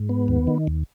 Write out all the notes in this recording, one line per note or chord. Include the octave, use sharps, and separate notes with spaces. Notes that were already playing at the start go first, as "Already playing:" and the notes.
Already playing: G#2
B3
D#2
D#3
D#2